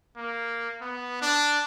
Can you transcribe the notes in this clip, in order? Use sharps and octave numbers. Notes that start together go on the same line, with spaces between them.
A#3
B3
D4